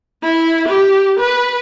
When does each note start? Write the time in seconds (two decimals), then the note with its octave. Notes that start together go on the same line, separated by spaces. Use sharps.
0.23 E4
0.68 G4
1.20 B4